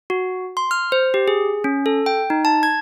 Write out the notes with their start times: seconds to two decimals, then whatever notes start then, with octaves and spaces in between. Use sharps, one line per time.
0.10 F#4
0.57 C6
0.71 F6
0.92 C5
1.14 G4
1.28 G#4
1.64 C#4
1.86 A4
2.06 G5
2.30 D#4
2.45 A5
2.63 G#6